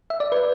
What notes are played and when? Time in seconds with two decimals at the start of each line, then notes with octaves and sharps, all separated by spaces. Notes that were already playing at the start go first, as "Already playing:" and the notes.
0.10 E5
0.20 D5
0.32 B4